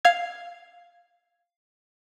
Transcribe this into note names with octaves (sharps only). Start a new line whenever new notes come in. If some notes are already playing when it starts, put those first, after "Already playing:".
F5 F6 G#6